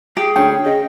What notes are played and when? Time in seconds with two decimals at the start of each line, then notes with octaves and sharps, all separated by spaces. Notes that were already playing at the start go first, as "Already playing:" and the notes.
0.17 G4 G#4
0.36 D2 C#4 G5
0.65 C#3 D#5